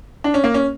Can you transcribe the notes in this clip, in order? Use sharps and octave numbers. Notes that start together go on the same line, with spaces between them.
D4
C#4
A#3
C#4